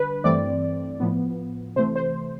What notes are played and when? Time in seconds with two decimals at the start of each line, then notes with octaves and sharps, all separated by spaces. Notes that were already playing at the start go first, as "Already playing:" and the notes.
Already playing: D3 G3 D4 B4
0.24 G2 E3 A3 C4 D5
1.00 A2 F3 B3
1.76 C3 E3 A3 C5
1.96 C5